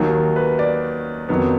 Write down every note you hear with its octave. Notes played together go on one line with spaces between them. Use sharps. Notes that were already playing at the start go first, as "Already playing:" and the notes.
Already playing: D#2 D#3 F#3
B4
D5
F2 D#3 F#3 B3